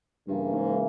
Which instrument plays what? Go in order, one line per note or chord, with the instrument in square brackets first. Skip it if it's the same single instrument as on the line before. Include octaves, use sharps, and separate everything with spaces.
[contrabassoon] G2 [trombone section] C#3 E3 A#3 E4
[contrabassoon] G#2